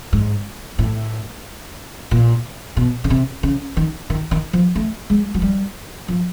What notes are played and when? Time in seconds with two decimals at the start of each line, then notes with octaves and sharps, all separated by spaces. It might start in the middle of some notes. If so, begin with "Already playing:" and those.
0.13 G#2
0.78 A2
2.11 A#2
2.77 B2
3.04 C#3
3.10 C3
3.43 C#3
3.77 D#3
4.10 D#3
4.31 D#3
4.53 F3
4.75 A3
5.10 G#3
5.34 F#3
5.42 G3
6.08 F3